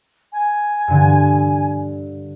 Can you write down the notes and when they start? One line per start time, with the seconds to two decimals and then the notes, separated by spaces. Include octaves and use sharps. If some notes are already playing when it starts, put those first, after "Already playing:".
0.33 G#5
0.88 G2 D3